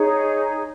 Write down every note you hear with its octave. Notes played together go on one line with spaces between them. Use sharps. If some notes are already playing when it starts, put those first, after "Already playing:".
Already playing: D#4 G#4 C#5